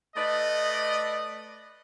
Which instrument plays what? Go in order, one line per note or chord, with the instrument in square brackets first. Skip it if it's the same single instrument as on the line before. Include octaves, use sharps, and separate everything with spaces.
[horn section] A3 B4 D5 D#5